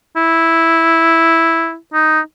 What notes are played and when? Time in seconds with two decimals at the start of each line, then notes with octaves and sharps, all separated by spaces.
0.16 E4
1.93 D#4